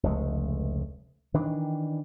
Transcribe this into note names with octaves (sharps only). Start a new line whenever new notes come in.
F1 C#2 G#3 A3
D#3 E3 D4